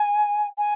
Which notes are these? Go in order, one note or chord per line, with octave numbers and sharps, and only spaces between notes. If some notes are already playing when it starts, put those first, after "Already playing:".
Already playing: G#5
G#5